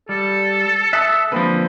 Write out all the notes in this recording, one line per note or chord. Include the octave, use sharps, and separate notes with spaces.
G3 A4
E5 A5 D#6 E6 F#6 B6
D3 F3 A#3 C4 B4